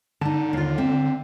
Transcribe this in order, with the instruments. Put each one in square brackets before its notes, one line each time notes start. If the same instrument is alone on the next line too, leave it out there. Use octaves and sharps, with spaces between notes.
[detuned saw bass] D3 [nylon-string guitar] D#4 A5
[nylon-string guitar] D#2 F4
C4 E5